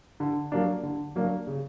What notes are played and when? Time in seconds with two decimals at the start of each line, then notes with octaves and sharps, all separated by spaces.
0.20 D3
0.52 F#3 A#3 D4
0.83 D3
1.16 F#3 A#3 D4
1.47 C#3